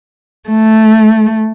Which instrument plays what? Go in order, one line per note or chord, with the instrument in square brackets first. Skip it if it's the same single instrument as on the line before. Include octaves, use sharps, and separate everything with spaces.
[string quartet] A3